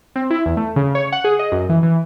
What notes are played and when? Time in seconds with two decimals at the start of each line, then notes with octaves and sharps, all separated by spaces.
0.16 C4
0.30 E4
0.46 E2
0.57 A3
0.76 C#3
0.95 C#5
1.12 F#5
1.24 G#4
1.39 D#5
1.52 F#2
1.69 E3
1.83 E3